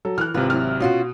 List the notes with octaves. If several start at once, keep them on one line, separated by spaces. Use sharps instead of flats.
F#3 A4
E3 F6 F#6
G#1 C3 F4 B4
F#3 E4 F6
B2 C#4 F4 F#4